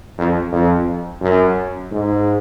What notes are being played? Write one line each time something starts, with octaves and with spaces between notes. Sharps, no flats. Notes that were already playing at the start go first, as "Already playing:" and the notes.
F2
F2
F#2
G#2